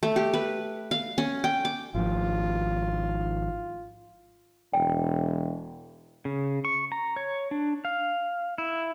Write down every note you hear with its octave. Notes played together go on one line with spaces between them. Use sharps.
A3
G4
B4
F5
C#4
G5
D6
G#1 F3 F4
E1 G5
C#3
C#6
A#5
C#5
D4
F5
E4